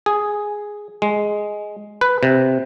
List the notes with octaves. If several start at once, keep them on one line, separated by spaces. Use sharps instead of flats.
G#4
G#3
B4
C3